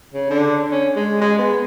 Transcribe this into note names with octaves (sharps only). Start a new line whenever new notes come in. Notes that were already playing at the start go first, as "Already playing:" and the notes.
C#3
D3
C#4
G#3
G#3
B3